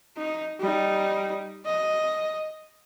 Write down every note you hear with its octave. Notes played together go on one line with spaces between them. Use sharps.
D#4
G3 D#4
D#5